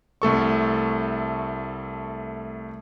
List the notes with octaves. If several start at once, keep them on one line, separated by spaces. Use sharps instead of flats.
C2 A3 A4 C#6